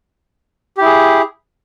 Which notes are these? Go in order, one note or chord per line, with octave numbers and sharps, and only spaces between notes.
E4 G4 G#4